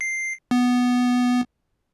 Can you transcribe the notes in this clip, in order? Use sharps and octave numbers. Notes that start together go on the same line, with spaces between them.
C7
B3